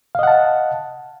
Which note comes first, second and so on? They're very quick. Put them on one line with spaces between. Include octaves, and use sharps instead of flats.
F5 D#5 F#5 A5